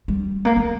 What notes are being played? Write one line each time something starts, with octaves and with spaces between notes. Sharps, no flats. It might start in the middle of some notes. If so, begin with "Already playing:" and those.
G3
A#3
A3